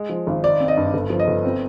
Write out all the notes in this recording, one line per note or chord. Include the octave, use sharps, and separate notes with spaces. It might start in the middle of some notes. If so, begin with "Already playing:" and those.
Already playing: G#3
F3
G#1
D#4 D5
C4
D#5
G2
G1
F3
D#5
G1
C4